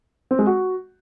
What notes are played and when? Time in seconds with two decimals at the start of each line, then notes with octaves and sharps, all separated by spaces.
0.31 C4
0.39 G#3
0.47 F#4